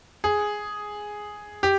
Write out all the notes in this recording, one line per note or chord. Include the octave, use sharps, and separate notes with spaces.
G#4
G4